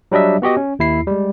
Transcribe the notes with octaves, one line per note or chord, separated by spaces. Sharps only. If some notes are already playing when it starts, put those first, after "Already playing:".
F#3 G3 D4 D#5 E5
B3 F#4 G4 D#5
C#4
D#2 E4 C7
G3 G#3